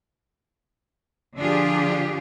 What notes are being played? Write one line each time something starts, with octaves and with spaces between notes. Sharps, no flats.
D3 F3 D4 F4 G4 G#4